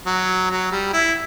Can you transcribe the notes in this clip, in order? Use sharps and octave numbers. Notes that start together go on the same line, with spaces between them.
F#3
F#3
G3
E4